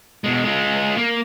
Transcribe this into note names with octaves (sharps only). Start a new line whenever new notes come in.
B2 G#3
G#3 F4
A#3